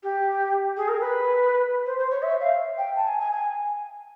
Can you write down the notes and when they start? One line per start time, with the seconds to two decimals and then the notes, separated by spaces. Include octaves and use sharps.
0.03 G4
0.76 G#4
0.88 A#4
1.00 B4
1.86 C5
1.98 C5
2.10 C#5
2.22 E5
2.40 F5
2.77 G5
2.95 A5
3.07 G#5
3.20 G#5
3.32 G#5